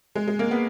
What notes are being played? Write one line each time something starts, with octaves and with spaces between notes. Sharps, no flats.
G#3
G#3
A#3
B3